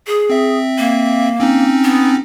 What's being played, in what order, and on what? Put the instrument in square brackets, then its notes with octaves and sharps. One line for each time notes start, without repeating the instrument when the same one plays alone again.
[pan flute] G#4
[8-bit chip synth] C4 E5
[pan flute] A#3
[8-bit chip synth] C4 C#4 D#4
[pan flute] B3